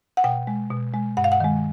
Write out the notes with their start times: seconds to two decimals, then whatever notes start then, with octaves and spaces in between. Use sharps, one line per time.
0.17 F#5
0.24 B2 G5
0.47 G#3
0.71 B2
0.94 G#3
1.17 G2 F#5
1.24 F5
1.32 F#5
1.40 D#3 G#3